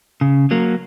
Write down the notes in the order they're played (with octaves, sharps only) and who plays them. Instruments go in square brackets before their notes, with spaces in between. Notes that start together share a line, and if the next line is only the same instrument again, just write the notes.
[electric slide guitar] C#3
F#3 A#3